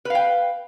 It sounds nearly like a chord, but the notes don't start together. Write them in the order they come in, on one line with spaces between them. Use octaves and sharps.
B4 F5 G5